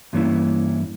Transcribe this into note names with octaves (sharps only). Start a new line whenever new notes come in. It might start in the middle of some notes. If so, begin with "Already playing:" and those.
G2 E3 A#3 C#4 E4